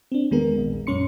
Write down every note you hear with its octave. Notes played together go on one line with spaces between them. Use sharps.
C4 D4
E2 D#3 G#3 B3 G#4 A#4
A#1
F#2 A#2 C#4 C6 C#7